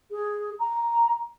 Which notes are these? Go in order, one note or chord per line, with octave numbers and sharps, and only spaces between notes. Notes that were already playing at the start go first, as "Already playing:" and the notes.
G#4
A#5